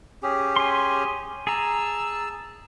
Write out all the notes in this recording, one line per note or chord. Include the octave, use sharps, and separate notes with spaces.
C#4 G4 G#4
G#5 C6
G#4 A5 A#5 E6